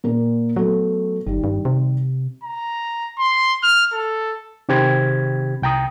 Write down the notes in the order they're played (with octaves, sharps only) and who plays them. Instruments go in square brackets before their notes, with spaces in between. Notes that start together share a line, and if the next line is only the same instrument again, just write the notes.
[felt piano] A#2 A#4
[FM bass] F#3 [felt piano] A3 B3
[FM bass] G1 [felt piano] D#3 G3
[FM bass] G2
C3
[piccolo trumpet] A#5
C6
F6
A4
[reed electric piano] C3 D#3 C4 G4 B5 G#6
C2 G5 A#5 D#6